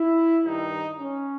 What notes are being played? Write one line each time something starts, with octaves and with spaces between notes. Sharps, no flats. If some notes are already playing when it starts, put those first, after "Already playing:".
Already playing: E4
G2 D#3 D#4
C#4